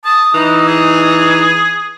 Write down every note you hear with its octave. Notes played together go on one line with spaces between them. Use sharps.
A5 D#6
E3 D#4 D#5
G#4